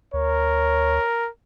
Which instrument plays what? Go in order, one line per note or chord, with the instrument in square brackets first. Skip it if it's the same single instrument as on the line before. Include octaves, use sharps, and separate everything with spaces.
[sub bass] D2 [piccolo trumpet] A#4 [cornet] C#5